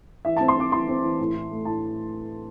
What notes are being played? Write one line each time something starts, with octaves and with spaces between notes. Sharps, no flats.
E3 E5
C4 A5
C6
C4 D6
E3 C6
C4
E3
A2
A2
A3
A2 A5